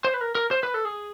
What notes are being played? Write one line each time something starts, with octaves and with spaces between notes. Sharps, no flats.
C5
B4
A#4
A#4
C5
B4
A4
G#4